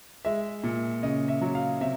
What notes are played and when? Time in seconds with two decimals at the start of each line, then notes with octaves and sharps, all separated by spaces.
0.25 G#3 E5
0.63 A#2
1.03 C#3 D#5
1.28 E5
1.41 F#3
1.55 F5
1.81 C3 E5